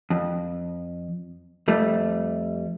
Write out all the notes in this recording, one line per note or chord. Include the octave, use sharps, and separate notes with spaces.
F2
F2 G3 A3